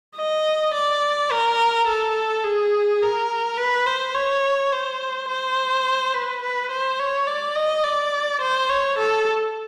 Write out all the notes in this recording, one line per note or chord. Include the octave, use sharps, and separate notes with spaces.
D#5
D5
A#4
A4
G#4
A#4
B4
C5
C#5
C5
C5
B4
B4
C5
C#5
D5
D#5
D5
C5
C#5
A4